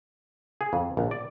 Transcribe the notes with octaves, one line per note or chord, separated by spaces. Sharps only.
G#4
F2
A#1
D5